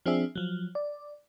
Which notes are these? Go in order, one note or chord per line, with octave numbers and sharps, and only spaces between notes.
F3 C4 D4 G#4 E5
F3 F#3
D5